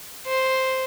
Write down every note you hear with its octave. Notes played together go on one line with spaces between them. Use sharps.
C5